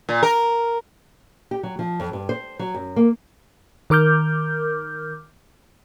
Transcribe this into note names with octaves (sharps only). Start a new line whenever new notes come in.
A#2
A#4
G4
F#3
F3
F2
G2
C5
F#3
F#2
A#3
D#3 A#4 D6 F6 G6